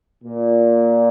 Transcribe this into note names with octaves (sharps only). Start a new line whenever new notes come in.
A#2